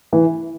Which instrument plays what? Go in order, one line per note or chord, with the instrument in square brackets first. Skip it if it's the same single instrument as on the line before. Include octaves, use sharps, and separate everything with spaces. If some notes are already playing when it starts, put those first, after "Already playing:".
[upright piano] E3